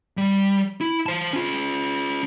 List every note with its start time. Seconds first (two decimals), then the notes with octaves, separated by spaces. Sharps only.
0.17 G3
0.81 E4
1.06 C5 A5
1.33 C#4 F4